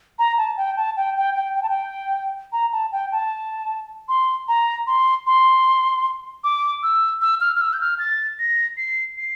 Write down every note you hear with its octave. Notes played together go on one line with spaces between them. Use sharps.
A#5
A5
G5
A5
G5
G5
G5
G5
A5
G5
A#5
A5
G5
A5
C6
A#5
C6
C6
D6
E6
E6
F6
F6
E6
G6
F6
A6
A#6
C7
C7